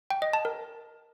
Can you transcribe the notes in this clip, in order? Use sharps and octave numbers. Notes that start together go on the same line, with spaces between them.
G5
D#5
A5
A#4